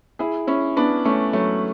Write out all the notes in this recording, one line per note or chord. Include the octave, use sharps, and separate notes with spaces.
E4 G#4
C#4 E4
B3 D4
A3 C#4
F#3 A3